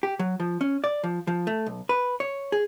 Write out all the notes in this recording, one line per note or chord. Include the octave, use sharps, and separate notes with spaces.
G4
F#3
F3
C#4
D5
F3
F3
A3
B1
B4
C#5
G#4